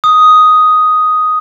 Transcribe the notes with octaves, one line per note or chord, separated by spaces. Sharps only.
D#6